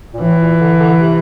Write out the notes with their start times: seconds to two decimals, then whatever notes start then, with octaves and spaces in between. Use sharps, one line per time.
0.14 A#2
0.21 A2 E3
0.41 A#2
0.60 D3
0.79 D3
0.98 C3